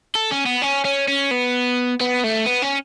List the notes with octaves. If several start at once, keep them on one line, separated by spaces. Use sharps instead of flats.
A4
C#4
B3
C#4
C#4
C#4
B3
B3
A3
B3
C#4